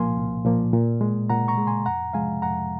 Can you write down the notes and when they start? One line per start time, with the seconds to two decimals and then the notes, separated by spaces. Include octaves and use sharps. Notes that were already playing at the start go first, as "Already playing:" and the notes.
Already playing: C2 A#2 F3 A#3 F5 G#5 C6
0.16 C2
0.45 A#2 F3 A#3
0.73 A#2
1.01 G#3
1.30 A#2 F#5 A#5
1.48 A#5 C#6
1.58 G#3
1.67 G#5 C6
1.86 F2 F#5 A#5
2.13 C3 F3 G#3 F5 G#5
2.42 F2 F#5 A#5